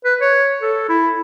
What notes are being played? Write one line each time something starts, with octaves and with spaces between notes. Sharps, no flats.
B4
C#5
A4
E4